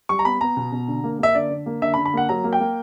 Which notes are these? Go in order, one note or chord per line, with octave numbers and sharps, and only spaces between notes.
G3 C#6
A#5
B3 B5
B3 A#5
B2
B2
D3
A#3
A#3 E5
D3 D5
D3
A#3
D3 E5
B5
D3
B5
A#3 F#5
F#3 A#5
A#3
G5
A#3